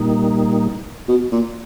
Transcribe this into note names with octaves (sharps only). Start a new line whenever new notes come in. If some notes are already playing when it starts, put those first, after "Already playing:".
Already playing: A#2 G3 A#3 D#4
B2
A#2